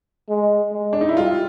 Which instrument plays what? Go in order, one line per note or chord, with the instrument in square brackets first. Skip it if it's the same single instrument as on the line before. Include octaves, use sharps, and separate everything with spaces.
[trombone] G#3
G#3
[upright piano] D4
D#4
E4
[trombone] G3 [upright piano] F4